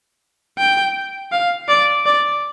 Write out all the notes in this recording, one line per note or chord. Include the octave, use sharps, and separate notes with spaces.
G5
F5
D5
D5